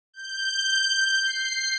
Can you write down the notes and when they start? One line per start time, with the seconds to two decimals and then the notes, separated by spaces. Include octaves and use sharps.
0.14 G6
1.23 C7